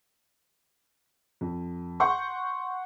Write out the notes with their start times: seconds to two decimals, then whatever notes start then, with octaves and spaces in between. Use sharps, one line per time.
1.41 F2
2.00 F#5 C6 C#6 G6